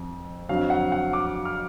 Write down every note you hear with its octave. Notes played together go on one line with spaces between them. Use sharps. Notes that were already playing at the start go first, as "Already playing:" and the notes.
Already playing: F2
F2 D3 F#3 F5
F#5
F#5
D6
F6